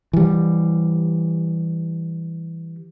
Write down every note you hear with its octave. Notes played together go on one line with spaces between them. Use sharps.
E3 G3